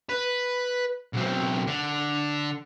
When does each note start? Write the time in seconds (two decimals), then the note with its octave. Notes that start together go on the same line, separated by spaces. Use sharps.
0.09 B4
1.13 B1 C4
1.67 D3